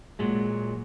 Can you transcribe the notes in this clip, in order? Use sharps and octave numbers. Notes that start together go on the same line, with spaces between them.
A#2 F#3 G#3